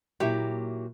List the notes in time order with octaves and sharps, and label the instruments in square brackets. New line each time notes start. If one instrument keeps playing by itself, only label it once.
[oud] A#2 F#3 E4 [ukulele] G4